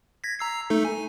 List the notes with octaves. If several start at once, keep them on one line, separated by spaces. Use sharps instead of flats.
G#6 A#6 B6
A#5 E6 C7
A3 D#4 A4
G#5